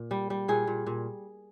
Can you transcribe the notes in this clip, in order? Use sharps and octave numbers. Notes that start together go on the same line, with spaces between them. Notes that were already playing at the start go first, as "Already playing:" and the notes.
Already playing: A#2
G3
G3
A#2 G#4
A#2
A#2